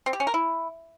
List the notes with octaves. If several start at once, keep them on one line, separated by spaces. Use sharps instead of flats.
C4
G4
C#4
A#4
E4